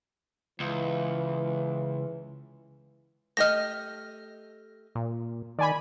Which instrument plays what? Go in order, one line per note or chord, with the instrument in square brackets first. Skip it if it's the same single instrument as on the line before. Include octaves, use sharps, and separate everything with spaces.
[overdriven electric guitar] C#2 [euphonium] E3
[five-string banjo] A3 G4 D#5 [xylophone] F6 A#6
[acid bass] A#2
[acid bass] D#3 [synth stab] D5 G#5 B5